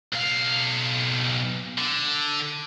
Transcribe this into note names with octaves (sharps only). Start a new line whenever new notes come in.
B1 F5
D3